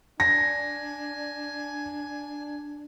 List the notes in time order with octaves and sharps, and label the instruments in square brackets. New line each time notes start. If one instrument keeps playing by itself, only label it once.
[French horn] D4 [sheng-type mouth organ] G#5 [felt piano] A#6